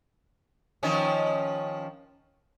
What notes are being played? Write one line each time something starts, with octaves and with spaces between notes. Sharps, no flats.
D#3 F3 C#4